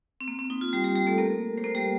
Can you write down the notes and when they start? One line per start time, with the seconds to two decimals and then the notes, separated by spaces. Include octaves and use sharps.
0.21 C4
0.28 A#3
0.39 C4
0.50 D#4
0.61 F4
0.73 G3 G4
0.84 G3 G4
0.96 G3 G4
1.07 A3 A4
1.18 A#3 A#4
1.58 C5
1.64 A#3 A#4
1.75 G3 G4